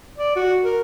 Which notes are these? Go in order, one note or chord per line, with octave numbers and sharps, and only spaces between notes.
D5
F#4
A#4